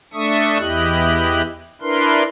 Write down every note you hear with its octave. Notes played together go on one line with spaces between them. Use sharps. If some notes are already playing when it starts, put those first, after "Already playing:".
A3 D4 A4 E5 C#6 D#6
E2 E4 G4 D#5 F#6
D4 E4 A#4 B4 C6